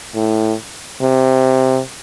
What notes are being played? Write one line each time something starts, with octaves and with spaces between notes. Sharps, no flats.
A2
C3